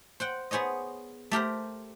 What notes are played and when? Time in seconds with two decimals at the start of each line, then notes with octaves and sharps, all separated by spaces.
0.20 C5 F#5 G5
0.51 B3 G#4 C5 C#5 D#5
1.31 A3 G4 A#4 C5